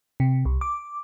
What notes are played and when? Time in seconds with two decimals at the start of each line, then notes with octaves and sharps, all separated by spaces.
0.20 C3
0.45 C2
0.61 D6